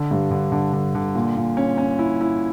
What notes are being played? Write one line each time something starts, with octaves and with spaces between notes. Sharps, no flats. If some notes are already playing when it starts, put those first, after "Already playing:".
Already playing: D3
G2
D3
D3
D3
D3
A#2
A#2
C#4
C#4
E4
E4